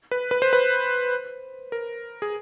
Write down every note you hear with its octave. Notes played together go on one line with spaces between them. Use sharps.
B4
B4
C5
B4
A#4
G#4